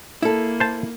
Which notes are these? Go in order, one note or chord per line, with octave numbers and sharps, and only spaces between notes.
A#3 E4 A4
C5 A5